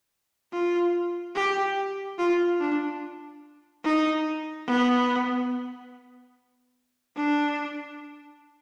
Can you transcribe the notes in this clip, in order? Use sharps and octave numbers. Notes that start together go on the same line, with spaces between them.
F4
G4
F4
D4
D#4
B3
D4